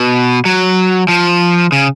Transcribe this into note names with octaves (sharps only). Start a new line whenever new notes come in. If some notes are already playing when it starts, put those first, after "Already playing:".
Already playing: B2
F#3
F3
C#3